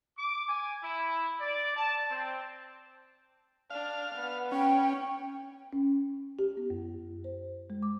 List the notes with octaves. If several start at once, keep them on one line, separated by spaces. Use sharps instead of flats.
D6
G#5
E4
D5
A5
C4
D4 F5
B3
C#4 G5
C#4
G4
B3
F#2
C5
G#3
D6